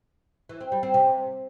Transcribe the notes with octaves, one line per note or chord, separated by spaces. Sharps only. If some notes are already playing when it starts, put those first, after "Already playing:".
E3
C4
G3
C4
C3